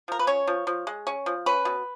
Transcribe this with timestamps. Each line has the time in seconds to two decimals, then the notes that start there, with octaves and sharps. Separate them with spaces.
0.08 F3 A#4
0.19 B4
0.27 C#4 C#5
0.47 F3
0.67 F3
0.87 G#3
1.07 C#4
1.26 F3
1.46 C#4 B4
1.65 B2